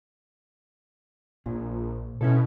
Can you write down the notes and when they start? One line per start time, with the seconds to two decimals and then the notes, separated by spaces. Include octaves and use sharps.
1.46 A#1 A#2
2.21 B2 C#4 E4 A4